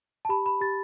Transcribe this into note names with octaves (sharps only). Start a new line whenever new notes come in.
A5
G4 B5
B5
G4 A6